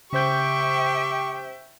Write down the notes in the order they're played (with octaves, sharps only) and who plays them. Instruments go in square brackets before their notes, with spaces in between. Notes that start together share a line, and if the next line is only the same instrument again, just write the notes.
[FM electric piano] C#3 C5 G6 [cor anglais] G4 [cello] E5 G5 [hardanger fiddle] C#6